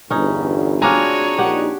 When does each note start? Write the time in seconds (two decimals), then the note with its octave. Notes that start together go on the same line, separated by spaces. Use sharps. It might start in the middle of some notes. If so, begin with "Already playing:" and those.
0.10 G1 E2 C#4 D#4
0.82 C4 D4 F4 F#4 G#4 C#5 G#5 A#5
1.38 A#1 D4 D#4 G4 F#5